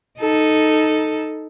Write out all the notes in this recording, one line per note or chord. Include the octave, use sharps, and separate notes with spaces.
D#4 A4